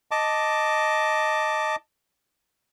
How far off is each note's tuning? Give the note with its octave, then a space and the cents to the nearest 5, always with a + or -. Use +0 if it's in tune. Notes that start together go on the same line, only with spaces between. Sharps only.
D#5 +0 A5 +5 D6 +0